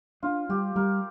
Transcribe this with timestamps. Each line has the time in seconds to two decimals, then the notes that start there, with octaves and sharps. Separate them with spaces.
0.23 D4 F4
0.49 G3 G4
0.76 G3 A#4